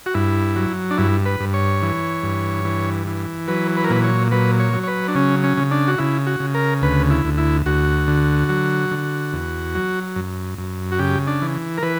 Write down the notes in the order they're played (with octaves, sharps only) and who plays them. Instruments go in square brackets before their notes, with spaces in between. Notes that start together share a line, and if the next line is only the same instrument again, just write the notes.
[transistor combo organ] F#4
G2 E4
F#3
D4
G2 E4
B4
G2
C#5
E3
G2
E3
E3
F#3 B4
B4
A#4
A#2 B4
C#5
F#3 B4
C#5
F#3
C#5
B4
D4
C#3 C#4
C#4
C#3
D4
F#4
C#3 E4
F#4
C#3
A#4
D2 B4
E4
D2
E4
D2 F#4
D3
F#3
D3
E2
F#3
F#2
F#2
F#4
C#3 G4
D4
E3
A#4
E3 B4